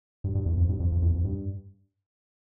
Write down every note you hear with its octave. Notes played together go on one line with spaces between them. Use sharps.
G2
G2
E2
F2
G2
F2
F2
E2
F2
G2